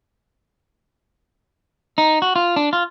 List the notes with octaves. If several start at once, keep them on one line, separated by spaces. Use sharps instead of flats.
D#4
F#4
F4
D4
F4